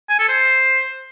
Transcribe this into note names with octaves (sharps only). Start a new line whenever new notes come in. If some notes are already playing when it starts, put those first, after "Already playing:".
G#5
A4
C5